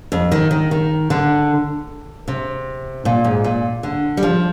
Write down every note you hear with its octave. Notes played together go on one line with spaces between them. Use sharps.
F2
D#3
D#3
D#3
D3
C3
A#2
G#2
A#2
D3
G3
F3